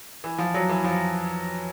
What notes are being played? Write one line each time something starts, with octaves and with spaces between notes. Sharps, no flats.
E3
F3
F#3
E3
F3